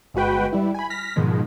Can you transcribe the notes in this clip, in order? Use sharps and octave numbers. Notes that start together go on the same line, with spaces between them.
G1 G#3 F#4 B4 G5
G3 E4
G#5 B5
F6 A#6 B6
G#2 B2 D#3 F3 G#3